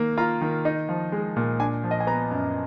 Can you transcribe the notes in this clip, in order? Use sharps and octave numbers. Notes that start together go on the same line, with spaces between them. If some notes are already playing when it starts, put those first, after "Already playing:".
Already playing: D#3 A#3 A#5
F4 A#5
D#3
D#4
F3
G#3
A#2
D4 G#5
F3
D#5
G#5
B3 A#5
F#2